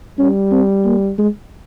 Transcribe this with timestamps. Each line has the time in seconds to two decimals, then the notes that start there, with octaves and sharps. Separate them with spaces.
0.19 G3 C#4
0.52 C4
0.85 A#3
1.18 G#3